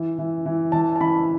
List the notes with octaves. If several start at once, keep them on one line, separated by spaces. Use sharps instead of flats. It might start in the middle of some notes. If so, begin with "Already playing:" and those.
Already playing: E3
E3
E3
E3 A5
A5
E3 B5